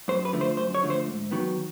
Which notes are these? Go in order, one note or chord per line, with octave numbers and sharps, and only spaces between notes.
F#2 C5
B4
D3 F3 A3
C5
F#2 C5
C#5
D3 F3 A3
C5
G#2
D#3 F#3 B3